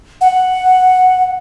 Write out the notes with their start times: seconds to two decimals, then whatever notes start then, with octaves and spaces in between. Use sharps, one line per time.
0.21 F#5